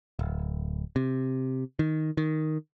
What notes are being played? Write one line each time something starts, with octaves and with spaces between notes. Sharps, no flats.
D1
C3
D#3
D#3